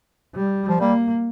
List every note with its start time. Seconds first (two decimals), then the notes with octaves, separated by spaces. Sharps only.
0.35 G3
0.68 F3
0.79 G3 A#3